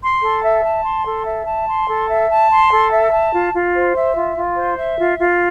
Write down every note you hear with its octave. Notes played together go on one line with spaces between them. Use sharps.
C6
A4
E5
A5
C6
A4
E5
A5
C6
A4
E5
A5
C6
A4
E5
A5
F4
F4
C5
E5
F4
F4
C5
E5
F4
F4